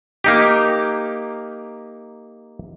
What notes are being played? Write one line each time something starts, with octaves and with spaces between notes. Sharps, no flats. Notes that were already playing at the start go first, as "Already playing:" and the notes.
A#3 D#4 G4